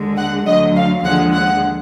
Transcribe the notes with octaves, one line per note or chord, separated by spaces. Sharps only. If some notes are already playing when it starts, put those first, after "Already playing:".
Already playing: D#2 D3 G#3
F#5
D2 D3 F#3 D#5
F5
D#2 D3 F3 G#3 F#5
F#5